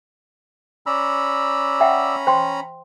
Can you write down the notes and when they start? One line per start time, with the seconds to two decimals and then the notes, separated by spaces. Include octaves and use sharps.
0.86 C#4 D5 A#5 B5 E6
1.80 E5 F#5 G5
2.27 C5 G5 C6